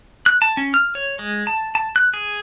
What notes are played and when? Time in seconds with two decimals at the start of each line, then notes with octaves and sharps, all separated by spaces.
0.26 F#6
0.42 A5
0.57 C#4
0.74 F6
0.95 C#5
1.19 G#3
1.47 A5
1.75 A5
1.96 F#6
2.14 G#4